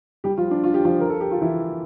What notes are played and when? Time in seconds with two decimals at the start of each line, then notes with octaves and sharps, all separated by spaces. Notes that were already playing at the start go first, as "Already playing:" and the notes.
0.24 G3 G4
0.37 F3 F4
0.51 D4
0.64 F4
0.74 G4
0.85 F3 F4
1.00 A#4
1.10 A4
1.20 G4
1.31 F4
1.41 E3 E4